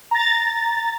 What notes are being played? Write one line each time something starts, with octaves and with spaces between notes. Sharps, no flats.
A#5 A6